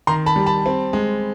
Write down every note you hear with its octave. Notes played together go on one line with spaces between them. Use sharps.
D#3 A#5 C6
A5 B5
G3
A5 B5
C4
G#3